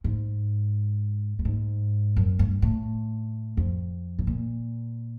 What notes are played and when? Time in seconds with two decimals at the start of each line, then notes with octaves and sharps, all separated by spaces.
0.04 G#2
1.39 G2
1.45 G#2
2.16 F#2
2.39 G2
2.62 A2
3.57 F2
4.19 A2
4.27 A#2